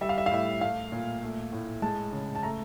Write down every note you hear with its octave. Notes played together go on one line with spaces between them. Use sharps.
G3 E5
F5
E5
F5
A2 E5
A3 F5
A#2
A3
A2
G#3 A5
C#3
A5
A3 A#5